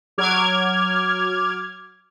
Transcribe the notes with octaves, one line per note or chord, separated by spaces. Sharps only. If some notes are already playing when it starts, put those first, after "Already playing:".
F#3 D6 F6 G#6